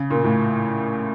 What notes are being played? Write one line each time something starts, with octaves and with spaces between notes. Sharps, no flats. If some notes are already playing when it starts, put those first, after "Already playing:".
Already playing: C#3
A#2
A2